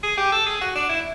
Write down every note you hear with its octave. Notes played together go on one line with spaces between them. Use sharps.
G#4
G4
A4
G#4
F#4
D4
E4